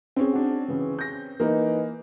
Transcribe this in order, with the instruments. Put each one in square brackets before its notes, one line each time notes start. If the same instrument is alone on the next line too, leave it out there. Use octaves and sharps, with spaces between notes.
[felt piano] C4 C#4 G#4
[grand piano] D4 F#4
C#3 E3
G6 A#6
[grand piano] E3 D#4 [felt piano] A#3